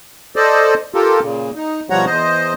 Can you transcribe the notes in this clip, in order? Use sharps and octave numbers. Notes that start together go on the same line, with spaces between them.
A4 C5 D5 D#5
F4 G4 A4 A#4
A#2 C#3
D#4
B2 F3 G3 C#5 F#5 A#5
E2 C5 D#5